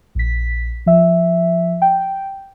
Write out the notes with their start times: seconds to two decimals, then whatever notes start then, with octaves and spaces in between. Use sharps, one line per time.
0.15 A#1 B6
0.86 F3 E5
1.82 G5